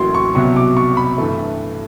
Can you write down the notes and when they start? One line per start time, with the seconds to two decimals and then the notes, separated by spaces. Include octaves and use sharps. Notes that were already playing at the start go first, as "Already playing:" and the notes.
Already playing: A1 A2 F#3 A#3 C6
0.14 C#6
0.35 C2 B2 F#3 C#6
0.56 D6
0.77 C#6
0.97 B5
1.18 G2 E3 A3